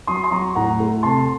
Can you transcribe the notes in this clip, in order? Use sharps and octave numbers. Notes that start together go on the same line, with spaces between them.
F#3 C6 D#6
C6
F#3 A#5 C#6
A2 F#5 A#5
A3
C3 A5 C6